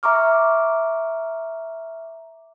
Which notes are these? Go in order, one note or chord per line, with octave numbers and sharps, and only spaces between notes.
E5 A#5 C#6 D6 F6